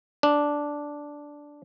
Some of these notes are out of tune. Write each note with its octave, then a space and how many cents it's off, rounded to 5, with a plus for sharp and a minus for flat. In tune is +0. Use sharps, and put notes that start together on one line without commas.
D4 -5